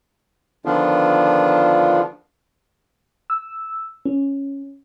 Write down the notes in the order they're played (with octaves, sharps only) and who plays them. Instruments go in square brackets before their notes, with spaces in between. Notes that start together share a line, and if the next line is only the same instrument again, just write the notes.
[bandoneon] D3 D#3 F3 B3 D4 F4
[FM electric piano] E6
C#4